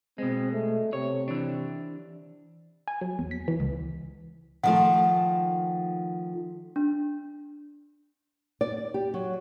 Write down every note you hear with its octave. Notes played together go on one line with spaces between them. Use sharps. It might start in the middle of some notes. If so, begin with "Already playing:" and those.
B2 G#3 C4
A3
C3 C#5
E3 D4
G#5
F#3
E2
B6
E3
C#2
D#3 F3 A3 F#5
D4
D5
G4
F#3